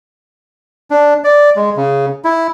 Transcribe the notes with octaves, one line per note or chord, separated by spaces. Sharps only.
D4
D5
G#3
C#3
E4